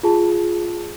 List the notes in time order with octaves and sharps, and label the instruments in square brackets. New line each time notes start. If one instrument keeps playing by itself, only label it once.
[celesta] F4 G#4 A5